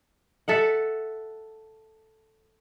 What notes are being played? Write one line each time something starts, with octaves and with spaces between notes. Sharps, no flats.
A4 E5 F#5